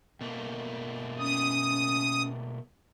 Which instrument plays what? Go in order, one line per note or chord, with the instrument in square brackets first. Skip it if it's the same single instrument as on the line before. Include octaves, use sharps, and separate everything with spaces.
[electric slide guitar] B2 A3 A#3
[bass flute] C#4 [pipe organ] D#6